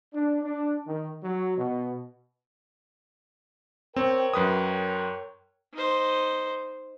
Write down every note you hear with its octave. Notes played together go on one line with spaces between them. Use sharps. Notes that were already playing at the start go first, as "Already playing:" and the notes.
D4
D4
D#3
F#3
B2
C4 A#4 C#5 G5
F#2 B4 D#6
D#4 C5